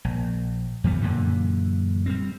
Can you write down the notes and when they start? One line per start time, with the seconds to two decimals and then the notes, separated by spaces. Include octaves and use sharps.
0.04 A#1
0.84 F2 E3 G3 B3
1.01 F#2 A#2 D3 E3
2.06 G3 G#3 C4